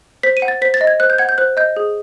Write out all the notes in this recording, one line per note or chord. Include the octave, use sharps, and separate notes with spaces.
C5 B6
D#7
F#5
A6
C5 B6
A6
D#5
G#6
C5 F#6
G6
F#5 G#6
G6
C5 F#6
D#5 G6
G#4